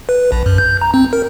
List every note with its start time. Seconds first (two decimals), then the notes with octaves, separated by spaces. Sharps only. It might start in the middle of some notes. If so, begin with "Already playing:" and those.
0.09 B4
0.32 A#1
0.46 F#2
0.58 G6
0.81 A#5
0.94 C4
1.13 A#4